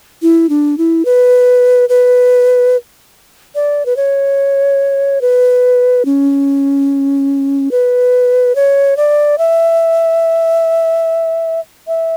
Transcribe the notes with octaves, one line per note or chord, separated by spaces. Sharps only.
E4
D4
E4
B4
B4
D5
B4
C#5
B4
C#4
B4
C#5
D5
E5
E5